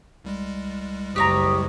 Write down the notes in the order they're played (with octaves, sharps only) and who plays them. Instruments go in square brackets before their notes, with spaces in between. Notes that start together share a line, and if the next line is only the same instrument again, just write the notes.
[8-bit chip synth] C2 G3 G#3
[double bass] F#1 [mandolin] G4 C#5 A#5 [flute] D#6